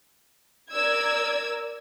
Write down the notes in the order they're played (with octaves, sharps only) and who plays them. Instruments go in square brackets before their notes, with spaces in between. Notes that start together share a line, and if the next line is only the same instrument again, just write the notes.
[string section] A#4 D5 E6 G#6